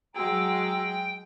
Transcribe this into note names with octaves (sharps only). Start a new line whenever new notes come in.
F#3 G#3 F#4 G5 A#5 E6